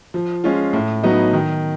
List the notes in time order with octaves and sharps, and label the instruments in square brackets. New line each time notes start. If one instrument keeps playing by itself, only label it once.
[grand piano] F3
G#3 C#4 F4
A2
F#3 B3 D#4 F#4
D#3